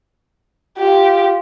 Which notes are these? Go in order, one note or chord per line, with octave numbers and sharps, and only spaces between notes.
F4 G4